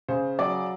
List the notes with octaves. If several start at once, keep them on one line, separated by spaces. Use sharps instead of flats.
C#3 C5
F#3 D5